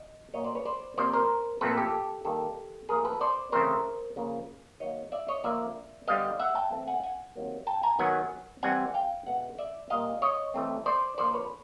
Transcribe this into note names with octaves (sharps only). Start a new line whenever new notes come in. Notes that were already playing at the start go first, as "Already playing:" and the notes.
Already playing: D#5
A#2 F#3 A#3 C#5 D#5
C5 D5
B4 C#5
C5 D5
C3 F3 A#3 C5 D5
A#4 C5
A#2 F3 A3 C4 A4 B4
G4 A4
D#3 G3 A#3 G4 A4
A#2 F3 A3 G#4 A#4
A4 B4
C5 D5
C#3 E3 A3 C4 A#4 C5
C#3 F3 A#3
D#3 F#3 A#3 C#5 D#5
D5 E5
C#5 D#5
D3 F3 A#3 D5 E5
D3 G3 B3 D#5 F5
E5 F#5
G5 A5
E3 A3 C4
F#5 G#5
F#5 G#5
C3 D#3 F#3 A#3
G5 A5
G#5 A#5
D#3 F#3 B3 F#5 G#5
E3 G3 C4 F#5 G#5
F5 G5
B2 G#3 B3 E5 F#5
D5 E5
A#2 G3 A#3 D#5 F5
C#5 D#5
E3 A3 C4
C5 D5
D3 F3 A#3 C5 D5
B4 C#5